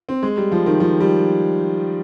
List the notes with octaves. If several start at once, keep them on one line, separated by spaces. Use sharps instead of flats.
C4
G#3
G3
F3
D#3
F3
G3